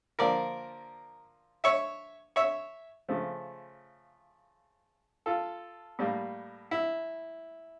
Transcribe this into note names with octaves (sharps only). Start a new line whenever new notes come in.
D3 F3 A#3 A#4 D5
C#5 E5
C#5 E5
C#3 F3 A3
F4 A4
A2 G3 A#3
E4